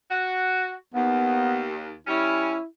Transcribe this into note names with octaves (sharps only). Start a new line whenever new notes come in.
F#4
D#2 B3
G3 C#4 E4